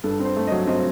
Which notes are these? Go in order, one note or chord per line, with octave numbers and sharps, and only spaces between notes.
G2 A4
C4
C5
A3
F#3 D#5
C4 D#5